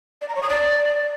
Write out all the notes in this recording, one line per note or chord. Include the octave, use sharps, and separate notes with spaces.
D5
A#5
C#5
D#6
D5